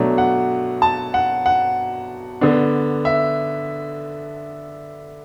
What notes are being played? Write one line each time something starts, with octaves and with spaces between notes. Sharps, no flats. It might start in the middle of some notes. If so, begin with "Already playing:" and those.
Already playing: B2 F#3 A3 D4
F#5
A5
F#5
F#5
D3 B3 D4
E5